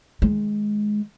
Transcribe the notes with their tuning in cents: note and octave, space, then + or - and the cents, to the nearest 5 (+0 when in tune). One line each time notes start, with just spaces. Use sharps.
D#3 +0 G#3 +10